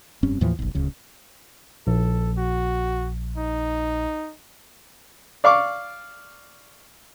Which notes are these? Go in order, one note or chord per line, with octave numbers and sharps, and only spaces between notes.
F1 G2 C4 C#4
D#2 A2 E3 F3
F#1 B1
D1 C#2 C#3
A#1 A4
F#4
D#4
D5 F5 C#6 D6